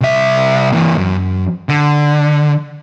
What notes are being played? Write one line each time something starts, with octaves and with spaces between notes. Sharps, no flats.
C2 E5
E3 A#3
F#2
D3